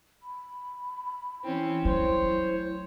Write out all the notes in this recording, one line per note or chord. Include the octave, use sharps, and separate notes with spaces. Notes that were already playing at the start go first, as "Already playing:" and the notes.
B5
E3 C4 C#4 E4
F#3 A3 C5 C#5